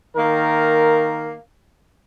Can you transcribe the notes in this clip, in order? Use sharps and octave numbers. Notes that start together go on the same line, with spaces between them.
D#3 A#3 A#4